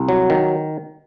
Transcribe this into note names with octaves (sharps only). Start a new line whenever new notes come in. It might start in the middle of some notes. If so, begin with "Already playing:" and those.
Already playing: C2
F#3
D#3